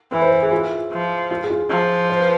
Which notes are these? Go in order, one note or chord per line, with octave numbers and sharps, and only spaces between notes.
E3 B4
C5
B4
G#4
F4
F3
F4
G#4
F4
F3
C5
B4